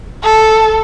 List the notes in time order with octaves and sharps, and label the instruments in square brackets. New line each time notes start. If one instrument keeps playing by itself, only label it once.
[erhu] A4